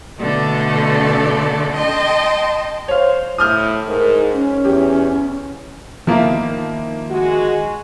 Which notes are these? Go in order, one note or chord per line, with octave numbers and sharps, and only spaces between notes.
B2 D3 A3 A4 D5
D#5 G5 A5 C6
C5 C#5 F5
A2 D#6 F6 G6
G#2 A#4
C#4
E2 G4
D#3 F3 A#3 E4
G#3 F#4